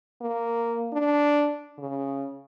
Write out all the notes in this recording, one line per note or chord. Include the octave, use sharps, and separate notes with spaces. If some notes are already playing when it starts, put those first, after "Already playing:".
A#3
D4
C#3